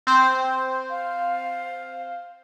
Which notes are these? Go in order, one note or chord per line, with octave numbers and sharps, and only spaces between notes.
C4 C5
F5